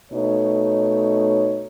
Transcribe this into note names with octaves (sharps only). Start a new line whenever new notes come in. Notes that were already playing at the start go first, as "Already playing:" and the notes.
B2 A3 D#4 C#5